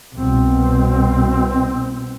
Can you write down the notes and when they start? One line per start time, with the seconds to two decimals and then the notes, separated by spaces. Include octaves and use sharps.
0.14 C2 B2 C4